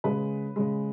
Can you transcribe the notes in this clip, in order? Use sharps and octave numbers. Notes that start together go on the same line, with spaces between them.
C#3 G#3 B4
C#3 G#3